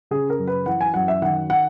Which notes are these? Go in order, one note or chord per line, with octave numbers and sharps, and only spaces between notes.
C#3 G#4
A#4
F#2
B4
E3 F#5
G#5
F#2 F#5
E5
D#3 F#5
F#5